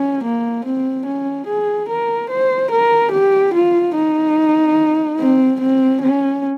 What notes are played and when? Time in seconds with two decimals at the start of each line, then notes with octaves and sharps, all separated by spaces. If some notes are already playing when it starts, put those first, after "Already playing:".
Already playing: C#4
0.24 A#3
0.66 C4
1.06 C#4
1.47 G#4
1.89 A#4
2.30 C5
2.71 A#4
3.12 G4
3.54 F4
3.95 D#4
5.20 C4
5.61 C4
6.02 C#4